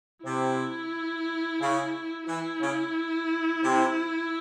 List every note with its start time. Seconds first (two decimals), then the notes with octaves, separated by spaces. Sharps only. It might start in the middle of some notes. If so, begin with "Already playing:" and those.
0.24 C3 E4
1.60 C#3
2.27 E3 E4
2.61 C#3
3.62 C3